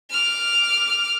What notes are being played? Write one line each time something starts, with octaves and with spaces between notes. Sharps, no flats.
D6 F6